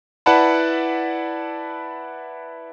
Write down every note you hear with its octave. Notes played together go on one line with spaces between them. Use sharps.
E4 B4 D5 F#5 A5 B5